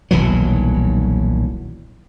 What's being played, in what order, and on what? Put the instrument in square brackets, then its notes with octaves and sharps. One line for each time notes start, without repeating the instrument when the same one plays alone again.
[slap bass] D#1 B1 E3 F#3